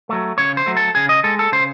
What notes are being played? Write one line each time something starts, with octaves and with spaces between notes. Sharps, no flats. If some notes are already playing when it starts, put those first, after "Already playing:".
F#3 A3
C#3 C#5
C5
F#3 A3
A4
C#3 G#4
D#5
G#3 A4
A4
C#3 C5